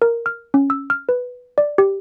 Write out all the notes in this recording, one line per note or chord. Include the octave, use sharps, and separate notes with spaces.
A#4
F6
C#4
E6
F6
B4
D5
G4